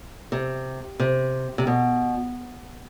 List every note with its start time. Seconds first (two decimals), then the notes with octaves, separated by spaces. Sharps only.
0.32 C3
1.00 C3
1.58 C3
1.67 B2